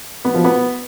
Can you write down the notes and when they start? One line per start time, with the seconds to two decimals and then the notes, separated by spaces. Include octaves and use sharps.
0.25 B3
0.34 F3
0.44 B3